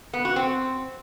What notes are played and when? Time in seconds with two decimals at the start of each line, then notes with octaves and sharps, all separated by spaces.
0.13 B3
0.25 F#4
0.36 C4